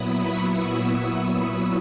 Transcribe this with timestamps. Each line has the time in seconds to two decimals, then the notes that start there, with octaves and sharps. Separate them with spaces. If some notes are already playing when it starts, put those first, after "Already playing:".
Already playing: A#2 F#3 B3 E4 B5 D#6
0.18 C#6 E6
0.56 C#6 E6
0.94 B5 D#6